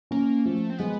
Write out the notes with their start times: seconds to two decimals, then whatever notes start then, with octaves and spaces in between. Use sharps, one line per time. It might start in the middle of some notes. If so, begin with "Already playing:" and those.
0.11 A#3 C#4
0.45 F3 A3
0.70 C4
0.79 G#3 B3